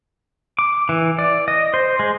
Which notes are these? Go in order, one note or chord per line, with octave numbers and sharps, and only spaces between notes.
D6
E3
D5
D#5
C5
G#3